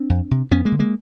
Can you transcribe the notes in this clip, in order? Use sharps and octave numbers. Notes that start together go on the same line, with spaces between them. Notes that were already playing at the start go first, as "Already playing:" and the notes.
Already playing: C4 D4
F2
C3
F2 B3 C#4
G#3 A#3
D3
G#3 A#3